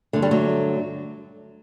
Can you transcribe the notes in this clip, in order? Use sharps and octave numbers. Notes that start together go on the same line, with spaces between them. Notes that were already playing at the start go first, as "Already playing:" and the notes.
G2 D3 A3
G3
F#3 A3